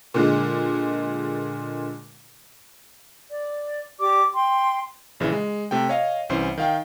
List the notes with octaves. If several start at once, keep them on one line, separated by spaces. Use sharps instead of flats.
A#2 D3 G#3
D5
G4 D5 D6
G5 C6
A#1 C#3 E3
G#3
C3 A3 G5
C#5 D#5 F5
C2 E3 C#4 C5 C6
D#3 F5 G5